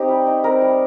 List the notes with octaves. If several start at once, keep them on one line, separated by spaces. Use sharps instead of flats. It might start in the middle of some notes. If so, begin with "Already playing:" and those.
Already playing: C4 D#4 G4
G3
D#4
C4 A#4
G3